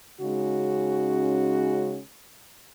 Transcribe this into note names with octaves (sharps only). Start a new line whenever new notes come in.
C#3 G#3 C#4 D#4 F#4